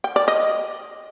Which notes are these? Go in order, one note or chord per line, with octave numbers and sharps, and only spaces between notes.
G5
D5
D#5